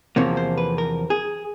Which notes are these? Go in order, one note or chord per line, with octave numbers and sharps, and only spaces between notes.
E2 C3 F3 A#3 C#5
C5
B4
A#4
G#4